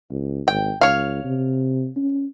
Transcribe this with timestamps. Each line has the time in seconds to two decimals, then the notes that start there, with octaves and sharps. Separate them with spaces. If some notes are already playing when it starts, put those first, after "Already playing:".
0.10 C#2
0.48 G#1 G5
0.81 C#2 C#5 F5
1.24 C3
1.96 C#4